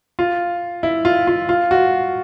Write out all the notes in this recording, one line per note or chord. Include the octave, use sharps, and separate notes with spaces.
F4
E4
F4
F4
F4
F#4